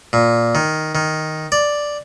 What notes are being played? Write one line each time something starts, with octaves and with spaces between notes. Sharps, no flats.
A#2
D#3
D#3
D5